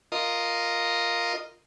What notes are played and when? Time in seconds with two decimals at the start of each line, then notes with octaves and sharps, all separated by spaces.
0.12 F4 A#4 D#5